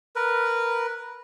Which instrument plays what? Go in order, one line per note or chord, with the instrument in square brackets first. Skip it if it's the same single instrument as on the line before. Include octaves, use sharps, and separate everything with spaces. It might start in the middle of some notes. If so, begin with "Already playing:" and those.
[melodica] A#4 B4